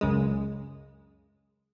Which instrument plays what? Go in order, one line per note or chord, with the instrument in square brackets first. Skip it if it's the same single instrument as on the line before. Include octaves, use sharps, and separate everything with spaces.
[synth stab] C#2 F#2 C#3 G#3